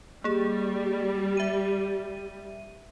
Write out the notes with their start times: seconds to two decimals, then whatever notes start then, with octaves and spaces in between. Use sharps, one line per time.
0.24 G3 A#3 G#4
1.37 E5 D#7